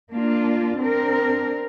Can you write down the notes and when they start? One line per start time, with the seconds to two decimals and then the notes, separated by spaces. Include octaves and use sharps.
0.11 A#3 D4 F4
0.78 C4 D4 A#4